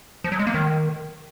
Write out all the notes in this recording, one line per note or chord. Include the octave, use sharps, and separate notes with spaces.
F3
F#3
G#3
A#3
D#3